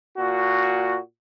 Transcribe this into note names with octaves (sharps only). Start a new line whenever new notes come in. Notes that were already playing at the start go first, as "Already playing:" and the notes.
A#2 F#4